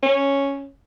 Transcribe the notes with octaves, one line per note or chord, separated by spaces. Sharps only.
C#4